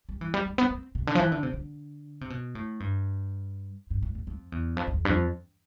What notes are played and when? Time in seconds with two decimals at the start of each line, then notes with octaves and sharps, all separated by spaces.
0.09 G3
0.21 E3
0.34 G3
0.46 G3
0.58 B3
0.71 C4
0.95 C3
1.07 D3
1.15 F3
1.20 E3
1.32 D3
1.43 C3
1.53 D3
2.21 C3
2.30 B2
2.55 A2
2.80 G2
3.90 G2
4.03 A2
4.15 E2
4.27 F2
4.52 E2
4.77 F2
4.87 F2
4.93 E2
5.05 G2
5.09 F2